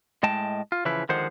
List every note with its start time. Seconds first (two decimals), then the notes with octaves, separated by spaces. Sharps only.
0.23 A2 G#3 D#5 G5 A5
0.72 F4
0.85 C#3 E3 F3 E4 B4
1.09 D3 D#3 F3 G#3 C5 F#5